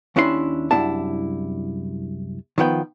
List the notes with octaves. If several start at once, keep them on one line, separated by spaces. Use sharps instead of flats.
D#2 C#4 D4 E4 G#4 C6
C2 F#2 D4 E4 A5
D#3 F3 B3 G5